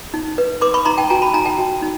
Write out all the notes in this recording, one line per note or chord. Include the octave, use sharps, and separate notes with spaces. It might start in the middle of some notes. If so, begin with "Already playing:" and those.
D#4
B4
B4 C6 D6
B5 C#6
D#4 A#5 C6
G5 A5
F#4 G#5 A#5
A5 B5
D#4 G#5 A#5
G5 A5
F#4
D#4